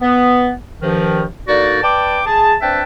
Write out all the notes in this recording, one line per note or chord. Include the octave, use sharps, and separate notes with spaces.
B3
G2 D#3 F3
D3 A#3 D#4 F#4 D5
B4 D5 G5 A5 D6
G#4 A5
C4 D4 B4 E5 G5 A5